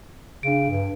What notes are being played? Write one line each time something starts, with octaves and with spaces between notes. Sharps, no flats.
C#3 D4 D7
G2